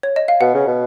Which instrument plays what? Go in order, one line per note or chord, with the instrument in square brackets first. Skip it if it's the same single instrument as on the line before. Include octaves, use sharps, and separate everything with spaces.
[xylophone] C#5
D#5
F5
[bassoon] B2 [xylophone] F#5
[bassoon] C#3
B2